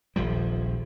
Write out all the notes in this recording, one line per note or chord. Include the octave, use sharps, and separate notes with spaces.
D#1 A#1 F3 G3